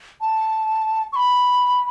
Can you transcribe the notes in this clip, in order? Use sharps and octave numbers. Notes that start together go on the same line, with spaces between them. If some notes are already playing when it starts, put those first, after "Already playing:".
A5
C#6
B5